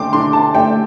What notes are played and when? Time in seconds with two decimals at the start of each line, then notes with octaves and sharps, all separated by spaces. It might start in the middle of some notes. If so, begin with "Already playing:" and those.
Already playing: D3 A3 G5 C6 D6
0.13 D3 C6
0.33 A5
0.54 A3 G5